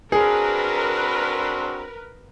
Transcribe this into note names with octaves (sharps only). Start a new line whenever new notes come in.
C4 D4 F#4 G#4 A#4 B4